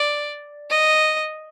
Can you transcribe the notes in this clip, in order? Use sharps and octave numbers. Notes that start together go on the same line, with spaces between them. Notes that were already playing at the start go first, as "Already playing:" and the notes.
Already playing: D5
D#5